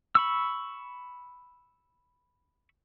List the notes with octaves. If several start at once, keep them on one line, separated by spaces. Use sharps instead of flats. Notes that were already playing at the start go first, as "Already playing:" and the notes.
B5 C#6 E6